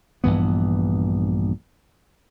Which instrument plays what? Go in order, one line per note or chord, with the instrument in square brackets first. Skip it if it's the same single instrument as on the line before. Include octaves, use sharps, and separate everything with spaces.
[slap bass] A#1 G2 E3 B3